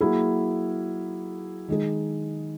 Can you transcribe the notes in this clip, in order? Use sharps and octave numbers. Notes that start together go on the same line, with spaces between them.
F#3 A#3 E4 G#4
D#3 G#3 D#4 G#4